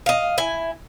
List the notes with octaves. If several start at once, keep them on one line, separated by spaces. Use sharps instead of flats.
D#5 F5
E4 G#5